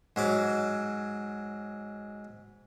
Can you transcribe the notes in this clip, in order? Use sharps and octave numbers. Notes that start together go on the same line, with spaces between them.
G#2 F#3 D6